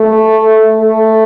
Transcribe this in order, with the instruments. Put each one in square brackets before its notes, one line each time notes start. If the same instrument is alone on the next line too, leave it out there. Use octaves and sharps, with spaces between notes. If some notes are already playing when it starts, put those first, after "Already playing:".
Already playing: [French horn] A3
A3